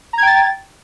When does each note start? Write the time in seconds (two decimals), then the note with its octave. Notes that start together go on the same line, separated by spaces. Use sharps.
0.13 A#5
0.18 G#6
0.23 G5
0.27 A6